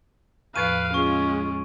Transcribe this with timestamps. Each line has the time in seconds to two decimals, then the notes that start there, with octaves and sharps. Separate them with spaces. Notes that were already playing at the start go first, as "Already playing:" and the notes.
0.56 E2 A2 F3 B4 F5 D7 D#7
0.94 G#3 C#4 F4 C#6